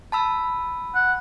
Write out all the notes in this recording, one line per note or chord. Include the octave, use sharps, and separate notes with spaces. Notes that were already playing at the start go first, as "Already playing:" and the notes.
A5 B5 E6
F#5